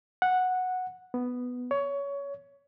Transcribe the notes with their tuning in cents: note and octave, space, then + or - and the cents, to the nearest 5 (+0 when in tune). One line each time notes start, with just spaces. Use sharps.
F#5 -5
B3 +5
C#5 +20